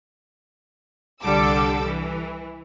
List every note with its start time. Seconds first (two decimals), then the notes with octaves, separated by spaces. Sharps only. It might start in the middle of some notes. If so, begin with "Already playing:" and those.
1.22 C2 D3 G3 A4 D6 E6
1.84 E3